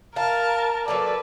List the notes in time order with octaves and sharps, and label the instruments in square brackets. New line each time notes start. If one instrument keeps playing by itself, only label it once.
[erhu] A#4 [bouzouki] F5 [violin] A5
[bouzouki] F#3 A#3 A4 [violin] B4 [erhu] D5